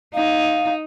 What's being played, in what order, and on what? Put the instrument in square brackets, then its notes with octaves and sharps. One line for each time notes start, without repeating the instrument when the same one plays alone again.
[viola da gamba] D#4 [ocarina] F5